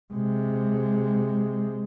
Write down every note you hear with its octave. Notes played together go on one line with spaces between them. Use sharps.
C3 G#3